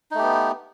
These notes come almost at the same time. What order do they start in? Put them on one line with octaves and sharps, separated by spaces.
D#4 A3 G4 B3